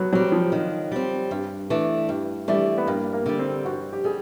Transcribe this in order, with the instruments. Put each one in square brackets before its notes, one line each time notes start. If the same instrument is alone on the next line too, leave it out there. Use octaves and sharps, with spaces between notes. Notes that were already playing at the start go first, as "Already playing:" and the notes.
Already playing: [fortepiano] F#3 B3
[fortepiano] F#3 [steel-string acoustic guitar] G3 C4
[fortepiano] F3
[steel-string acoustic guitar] D#3
G3 C4
G2
E3 A3 D4
G2
[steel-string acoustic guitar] E3 A3 D4 [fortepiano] G3
[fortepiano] B3
[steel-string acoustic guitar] G2 [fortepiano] A#3
[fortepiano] A#3
[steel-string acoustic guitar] D3 G3
[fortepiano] C4
[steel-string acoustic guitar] G2 [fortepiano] F#4
[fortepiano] G4
[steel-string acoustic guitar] G3 [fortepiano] G#4